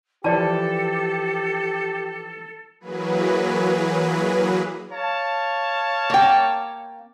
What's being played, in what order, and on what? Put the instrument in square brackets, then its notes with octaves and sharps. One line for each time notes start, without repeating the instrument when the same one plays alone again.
[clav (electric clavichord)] E3 F3 [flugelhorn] G4 [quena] A4 [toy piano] D5 A5
[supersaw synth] E3 F#3 A#3 G#4 B4
[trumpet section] C#5 F5 A5
[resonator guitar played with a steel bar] A#3 G5